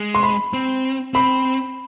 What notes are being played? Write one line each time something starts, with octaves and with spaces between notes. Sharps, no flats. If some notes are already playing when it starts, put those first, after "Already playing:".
Already playing: G#3
C6
B5
C4
C4 B5